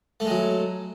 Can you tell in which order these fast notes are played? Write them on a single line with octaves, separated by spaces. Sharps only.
A3 G#3 F#3